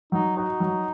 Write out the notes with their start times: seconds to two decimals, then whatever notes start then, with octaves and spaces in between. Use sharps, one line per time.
0.12 F#3 D#4
0.36 D#4 F#4
0.60 F#3